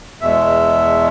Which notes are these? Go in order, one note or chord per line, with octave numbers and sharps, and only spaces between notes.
E2 B2 G#3 E5